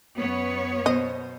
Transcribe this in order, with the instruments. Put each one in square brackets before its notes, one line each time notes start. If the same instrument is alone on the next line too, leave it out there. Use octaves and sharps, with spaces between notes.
[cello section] F#2 B3 C#5
[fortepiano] B2 C5 [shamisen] D#5